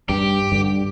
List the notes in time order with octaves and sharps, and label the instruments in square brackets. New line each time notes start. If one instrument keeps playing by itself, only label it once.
[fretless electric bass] G2 [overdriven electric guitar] G4
[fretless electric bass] G2 D3